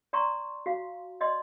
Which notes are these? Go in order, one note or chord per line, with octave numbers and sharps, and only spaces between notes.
D5 A#5 C6 C#6
F#4 F5
D5 D#5 C6